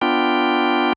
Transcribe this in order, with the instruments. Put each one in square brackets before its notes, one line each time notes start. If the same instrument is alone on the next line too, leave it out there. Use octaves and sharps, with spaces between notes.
[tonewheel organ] B3 D4 F4 G5